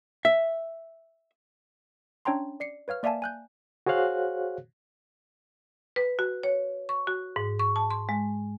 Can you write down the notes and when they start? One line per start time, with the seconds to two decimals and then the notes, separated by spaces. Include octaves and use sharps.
0.25 E5
2.25 C#4 D4 C#5 G5 A#5 C6
2.60 D5 C7 C#7
2.88 B4 C#5 F5 F6
3.03 A#3 D5 E5 F5 G#5 A5
3.22 G#5 F#6 G6
3.86 F#4 G#4 C5 C#5 F5 F#6
5.96 B4
6.19 F#4
6.43 C#5
6.89 C#6
7.07 F#4
7.36 G#2
7.59 C#6
7.76 A5
7.91 C6
8.09 G#3